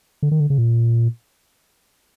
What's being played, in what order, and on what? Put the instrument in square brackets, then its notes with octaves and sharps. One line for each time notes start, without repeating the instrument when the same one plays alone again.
[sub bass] D3
D#3
D3
C#3
A#2